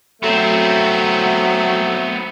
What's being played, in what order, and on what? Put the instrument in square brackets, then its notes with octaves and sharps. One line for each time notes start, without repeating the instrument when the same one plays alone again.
[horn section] F#3 A3 [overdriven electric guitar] B3 C4